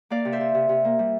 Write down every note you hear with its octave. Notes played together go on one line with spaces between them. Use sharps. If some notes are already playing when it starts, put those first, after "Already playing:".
A#3 D5 F5
C3
C5 E5
C3
C3
C3
A#3
G3